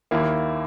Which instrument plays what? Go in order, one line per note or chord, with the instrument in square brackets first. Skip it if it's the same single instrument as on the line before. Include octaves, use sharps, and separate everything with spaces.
[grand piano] D#2 D#3 A#3 E4